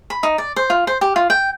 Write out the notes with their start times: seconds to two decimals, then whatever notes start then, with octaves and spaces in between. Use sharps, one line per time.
0.10 B5
0.23 D#4
0.38 D5
0.56 C5
0.70 F4
0.87 C5
1.01 G4
1.16 F4
1.30 G5